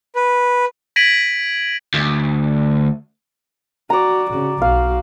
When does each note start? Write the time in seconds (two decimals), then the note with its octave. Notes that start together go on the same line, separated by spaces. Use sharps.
0.15 B4
0.96 G#6 A#6 B6 D7 D#7 F#7
1.94 D2
3.90 F#4 D5 A#5
4.31 C#3 F#4
4.62 B1 F#4 F5